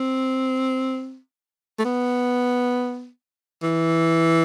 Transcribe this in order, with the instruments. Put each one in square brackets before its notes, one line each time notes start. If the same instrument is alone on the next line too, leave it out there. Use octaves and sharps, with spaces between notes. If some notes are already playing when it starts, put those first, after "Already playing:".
Already playing: [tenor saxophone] C4
A3
B3
E3